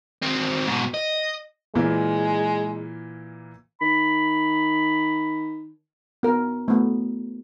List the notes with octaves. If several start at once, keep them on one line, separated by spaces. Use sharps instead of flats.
D#3 C4
G#2 B2
D#5
A#2 E3 G#3 A#3
D#3 B5
B3 A#4
A3 B3